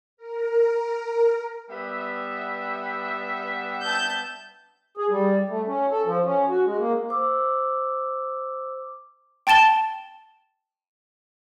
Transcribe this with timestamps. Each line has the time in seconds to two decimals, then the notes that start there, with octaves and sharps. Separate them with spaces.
0.17 A#4
1.69 G3 B3 E5
3.83 A5 G6
4.97 G#4
5.10 G3
5.49 A3
5.67 C#4
5.91 A4
6.06 F3
6.25 C#4
6.49 F#4
6.65 G#3
6.79 A#3
7.09 C5 D6 E6
9.47 G5 A5 A6 E7 G7